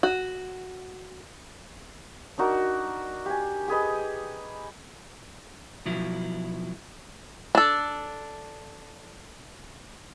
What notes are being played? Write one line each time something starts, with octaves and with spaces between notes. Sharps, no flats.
F#4
D4 D#4 F#4 A#4
G4 G#5
G4 G#4 B4 D#5
B2 F3 F#3 E4
D4 A4